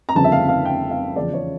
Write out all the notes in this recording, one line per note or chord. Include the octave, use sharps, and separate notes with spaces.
A#5
G1 F2 C#3 A5
E5
F5
F5
G5
F5
E2 C#3 F3 D5
C#5